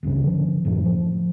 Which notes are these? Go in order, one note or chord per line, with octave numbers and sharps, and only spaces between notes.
D#1 C#2 G2 C#3
D3 F3
F#2 A2 F3
F3